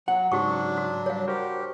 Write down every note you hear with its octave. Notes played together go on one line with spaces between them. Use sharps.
F#3 F#5
G#2 C#3 F#3 D4 F#4 G4 C#6
F#4
G3 C#5 F5
F#4 G4 A#4 C5